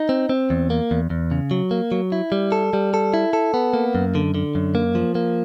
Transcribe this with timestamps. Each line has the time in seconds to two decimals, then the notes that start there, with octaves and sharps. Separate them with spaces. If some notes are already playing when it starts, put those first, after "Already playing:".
Already playing: D#4
0.09 C4
0.29 C4
0.50 E2
0.70 A#3
0.91 E2
1.10 E2
1.31 C#3
1.51 F#3
1.71 A#3
1.92 F#3
2.12 E4
2.32 G3
2.52 A4
2.73 G3
2.94 A4
3.14 E4
3.33 A4
3.54 B3
3.73 A#3
3.95 F#2
4.15 D3
4.35 D3
4.55 F#2
4.75 A#3
4.95 F3
5.15 A#3